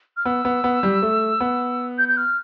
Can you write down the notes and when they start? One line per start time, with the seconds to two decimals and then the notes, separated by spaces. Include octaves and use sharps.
0.17 F6
0.26 B3 E6
0.45 B3
0.64 B3
0.83 G3
1.02 A3
1.41 B3
1.98 G6
2.08 G6
2.17 F6